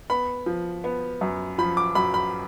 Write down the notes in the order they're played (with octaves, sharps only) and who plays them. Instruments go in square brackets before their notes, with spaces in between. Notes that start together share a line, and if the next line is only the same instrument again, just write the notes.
[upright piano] B3 [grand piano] B5
[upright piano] F3
B3
F#2
[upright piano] F3 [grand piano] B5
[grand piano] D6
[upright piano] F#2 [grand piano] B5
[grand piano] B5